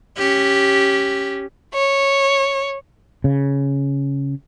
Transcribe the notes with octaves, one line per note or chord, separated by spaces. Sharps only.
C#4 G4
C#5
C#3